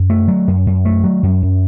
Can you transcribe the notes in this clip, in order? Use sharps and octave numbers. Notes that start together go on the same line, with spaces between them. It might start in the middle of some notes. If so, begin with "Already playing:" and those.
Already playing: F#2
A3
F#3
F#2
F#2
A3
F#3
F#2
F#2